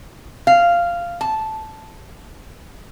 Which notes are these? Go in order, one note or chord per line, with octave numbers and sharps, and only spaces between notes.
F5
A5